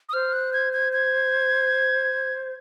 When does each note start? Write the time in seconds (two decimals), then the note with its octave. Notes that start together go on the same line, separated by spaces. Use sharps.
0.09 D#6
0.13 C5 F6
0.33 F#6
0.53 G#6
0.73 G#6
0.93 G#6